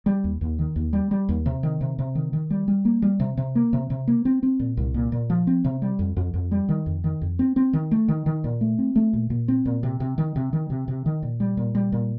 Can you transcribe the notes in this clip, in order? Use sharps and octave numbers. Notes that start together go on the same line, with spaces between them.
G3
D#2
D#2
D#3
D#2
G3
G3
D#2
C3
D#3
C3
C3
D#3
D#3
G3
G3
A#3
G3
C3
C3
A#3
C3
C3
A#3
C4
C4
A#2
C2
A#2
A#2
F3
C4
C3
G3
F2
F2
F2
G3
D#3
F2
D#3
F2
C4
C4
D#3
A3
D#3
D#3
A#2
A3
C4
A3
A#2
A#2
C4
A#2
C3
C3
D#3
C3
D#3
C3
C3
D#3
A#2
G3
A#2
G3
A#2